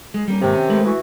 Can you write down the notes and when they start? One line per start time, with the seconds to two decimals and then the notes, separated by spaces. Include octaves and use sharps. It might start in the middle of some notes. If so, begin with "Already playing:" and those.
0.14 G#3
0.28 G3 A#3 C#4
0.42 G#2 C3 D#3 A#3
0.54 C#4
0.69 G#3 A3 B4
0.84 E3 F#4